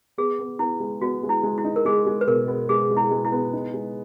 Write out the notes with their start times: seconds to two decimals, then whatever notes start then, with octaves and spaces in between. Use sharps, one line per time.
0.18 B3 G#4
0.39 B3
0.59 B3 E4
0.80 G#3
1.02 B3 F#4
1.23 G#3
1.29 E4
1.43 G#3
1.58 E4
1.64 D#4
1.76 A#4
1.85 G#3 G#4
2.06 G#3
2.21 B4
2.27 B2 A#4
2.48 B3
2.69 G#3 G#4
2.90 G#3
2.97 E4
3.11 G#3
3.25 E4
3.32 B3
3.53 D#4
3.74 G#3